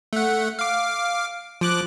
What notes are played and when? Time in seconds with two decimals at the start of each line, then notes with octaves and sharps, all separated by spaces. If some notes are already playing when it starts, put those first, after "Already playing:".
0.13 A3 F#5
0.59 F5 D6
1.61 F3 D6 F#6